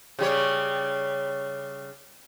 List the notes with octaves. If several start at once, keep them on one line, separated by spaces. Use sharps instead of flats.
C#3 G3 C#5